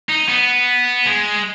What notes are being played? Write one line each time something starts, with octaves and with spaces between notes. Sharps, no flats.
D#4
B3
G#3